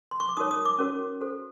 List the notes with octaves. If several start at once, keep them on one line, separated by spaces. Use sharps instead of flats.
C6
C#6
D6
D#4 F#4 A#4 C#5 D#6
D#6
D6
C#4 F#4 A#4 C#5
F#4 A4 C5